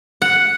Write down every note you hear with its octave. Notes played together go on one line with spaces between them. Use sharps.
F#5